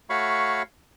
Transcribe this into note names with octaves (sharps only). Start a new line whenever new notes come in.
A3 F#4 C#5 F5 B5 C#6